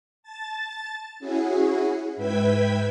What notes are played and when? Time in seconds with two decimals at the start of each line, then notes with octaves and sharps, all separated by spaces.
0.23 A5 A6
1.20 C#4 E4 F#4 G#4
2.17 G#2 B4 E5 G5 G#6 B6